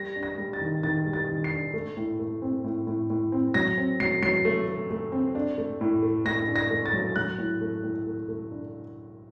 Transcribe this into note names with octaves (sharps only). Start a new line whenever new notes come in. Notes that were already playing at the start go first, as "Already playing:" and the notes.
Already playing: G3 A#6
D4
A#6
G3
A6
D#3
D#3 A6
G3
A6
D#3
C7
D4
A3
A2
A3
C4
A2
A2
A2
C4
F#3 A#6
C4
F#3 C7
F#3 C7
A3
A3
A3
C4
D4
A3
A2
A3
A2 A#6
D4
A#6
A3
A6
F#3
F#3 F#6
A2
A3
A2
A3
A3
D4